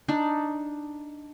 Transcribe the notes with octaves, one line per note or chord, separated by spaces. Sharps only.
D4 D#4